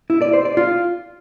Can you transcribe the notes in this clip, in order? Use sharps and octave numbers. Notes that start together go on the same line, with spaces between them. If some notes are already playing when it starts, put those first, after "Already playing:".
E4
D5
C5
D5
F4